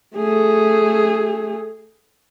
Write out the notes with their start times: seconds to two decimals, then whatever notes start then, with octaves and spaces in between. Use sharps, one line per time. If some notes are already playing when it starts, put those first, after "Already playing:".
0.16 A3 G#4